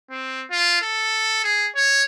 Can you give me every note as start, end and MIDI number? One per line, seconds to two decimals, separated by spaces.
0.11 0.44 60
0.51 0.78 65
0.82 1.42 69
1.43 1.68 68
1.75 2.03 73